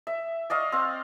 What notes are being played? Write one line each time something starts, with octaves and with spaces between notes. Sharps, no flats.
E5
D5 D#5 F5 C#6
C4 F5